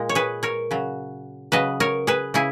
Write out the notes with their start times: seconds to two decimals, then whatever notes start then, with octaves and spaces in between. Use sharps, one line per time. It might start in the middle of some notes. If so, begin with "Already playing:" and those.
Already playing: A#2 G#3
0.09 C#5
0.15 G#4 B4
0.43 A#4 C#5
0.71 C#3 F#3
1.52 C#3 F#3 B4 D#5
1.80 A#4 C#5
2.07 G#4 B4
2.34 C#3 E4 G#4